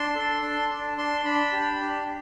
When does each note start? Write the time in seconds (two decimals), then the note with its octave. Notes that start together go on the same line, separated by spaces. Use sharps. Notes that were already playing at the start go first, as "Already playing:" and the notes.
Already playing: D4 C6
0.15 A4
0.42 D4
0.70 D4
0.98 D4 C6
1.25 D4 B5
1.53 G4
1.80 D4